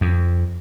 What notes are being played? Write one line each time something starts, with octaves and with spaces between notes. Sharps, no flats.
F2